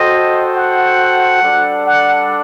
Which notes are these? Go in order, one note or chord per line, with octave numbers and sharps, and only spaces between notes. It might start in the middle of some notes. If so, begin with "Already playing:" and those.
Already playing: F#4 A4 C5 D#5 G5
F#5
G3 D4 A4 D5
F#5